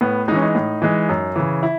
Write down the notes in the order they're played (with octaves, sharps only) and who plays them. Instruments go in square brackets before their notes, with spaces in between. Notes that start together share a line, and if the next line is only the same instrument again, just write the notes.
[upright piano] A2 B3
G#3 D#4
E3 C#4
D#4
A2
E3 G#3
F#2
C#3 E3
E4